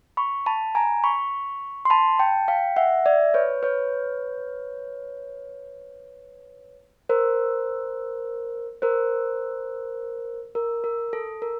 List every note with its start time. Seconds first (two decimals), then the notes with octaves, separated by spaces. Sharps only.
0.17 B5 C#6
0.46 A5 B5
0.75 G#5 A#5
1.04 B5 C#6
1.85 C6
1.90 A5 B5
2.19 G5 A5
2.48 F5 G5
2.76 E5 F#5
3.06 D5 E5
3.34 B4 C#5
3.63 B4 C#5
7.09 A#4 C5
8.82 A#4 C5
10.55 A#4
10.84 A#4
11.13 A4
11.42 A#4